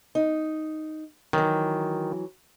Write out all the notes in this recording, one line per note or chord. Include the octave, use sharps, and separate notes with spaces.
D#4
D#3 E3 F#3